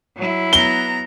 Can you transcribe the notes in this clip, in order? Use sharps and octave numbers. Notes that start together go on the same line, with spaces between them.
F#3 E4
B3 A#5 G7